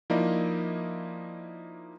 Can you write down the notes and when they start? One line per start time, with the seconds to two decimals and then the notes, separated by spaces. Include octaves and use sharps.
0.10 F3 A#3 D#4 E4 D5 D#5